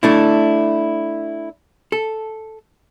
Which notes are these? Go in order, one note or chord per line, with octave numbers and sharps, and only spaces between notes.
A3 D4 E4
A4